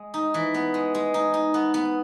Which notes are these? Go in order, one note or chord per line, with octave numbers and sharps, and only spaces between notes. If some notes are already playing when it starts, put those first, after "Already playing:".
Already playing: G#3
D#4
E3
B3
G#3
G#3
D#4
D#4
B3
B3